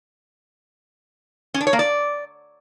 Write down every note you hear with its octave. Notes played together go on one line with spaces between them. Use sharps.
C#4
D4
C#5
A#3
D5